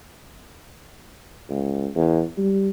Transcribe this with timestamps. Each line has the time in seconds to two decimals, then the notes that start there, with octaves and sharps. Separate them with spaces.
1.49 C#2
1.95 E2
2.38 G3